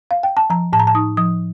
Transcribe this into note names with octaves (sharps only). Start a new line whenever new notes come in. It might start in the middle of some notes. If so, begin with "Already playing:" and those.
F5
G5
A5
F3 A#5
A2 A5
A#5
A5
D#4 D#6
F3 D#6